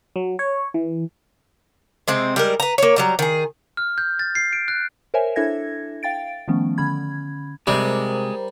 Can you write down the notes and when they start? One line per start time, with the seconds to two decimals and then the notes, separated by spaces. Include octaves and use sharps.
0.16 F#3
0.39 C#5
0.74 E3
2.08 C3 G#3 C4
2.36 G3 G#3 A#4
2.60 B4 A#5
2.78 A#3 C#5
2.96 F#3 G3 A#5
3.19 D#3 G#4
3.77 F6
3.98 G6
4.19 A6
4.35 C7
4.53 D7
4.68 F#6
5.14 A#4 C5 C#5 E5 G#5
5.36 D4 E4 A4 E5 G#6 A#6
6.03 F5 G5 A6 D7
6.48 D#3 F3 A3 B3 C#4
6.78 D3 C#4 B5 G#6
7.67 C3 G3 G#3 A#4 C5 A#5